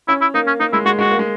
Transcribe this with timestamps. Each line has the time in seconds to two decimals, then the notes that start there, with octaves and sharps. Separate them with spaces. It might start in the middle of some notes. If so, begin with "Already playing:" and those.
0.08 C#4 E4
0.21 E4
0.34 A#3 D#4
0.47 C#4
0.60 A#3 D#4
0.73 G#3 E4
0.85 G#3 F#4
0.98 G#3 F#4
1.11 A#3
1.19 G#3